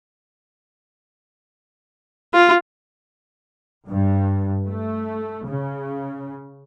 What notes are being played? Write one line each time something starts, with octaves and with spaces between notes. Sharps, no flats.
F4
G2
A3
C#3